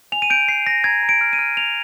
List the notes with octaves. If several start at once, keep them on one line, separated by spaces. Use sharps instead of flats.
G#5 F7
D#7
G6 D7
G6 C7
G6 A#6
A#5 G#6
A#5
D7
F6
D#7
F6
F6 F7